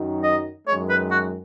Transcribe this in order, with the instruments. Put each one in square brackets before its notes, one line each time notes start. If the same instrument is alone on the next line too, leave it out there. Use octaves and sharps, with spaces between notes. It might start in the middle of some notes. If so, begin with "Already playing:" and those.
Already playing: [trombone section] F#2 D#3 F#3 D#4
[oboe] D#5
[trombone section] F#2 D#3 G#3 [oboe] C#5
[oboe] B4
F#4